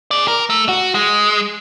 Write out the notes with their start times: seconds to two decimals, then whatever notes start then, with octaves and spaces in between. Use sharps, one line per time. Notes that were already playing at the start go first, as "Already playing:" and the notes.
0.11 G#4 D5
0.28 A#4
0.50 A3
0.69 F#4
0.95 G#3